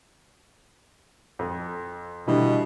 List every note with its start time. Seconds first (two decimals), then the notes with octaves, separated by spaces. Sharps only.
1.39 F2
2.27 B2 D3 E3 G3